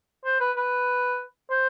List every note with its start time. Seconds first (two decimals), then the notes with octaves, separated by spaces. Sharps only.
0.25 C5
0.40 B4
0.57 B4
1.50 C5